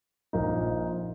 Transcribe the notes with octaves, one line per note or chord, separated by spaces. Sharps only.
A#1 A#2 A#3 D#4